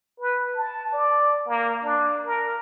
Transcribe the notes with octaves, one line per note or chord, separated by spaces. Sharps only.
B4
A5
D5
A#3
D4
A#4